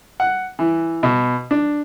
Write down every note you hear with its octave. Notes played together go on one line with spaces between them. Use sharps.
F#5
E3
B2
D4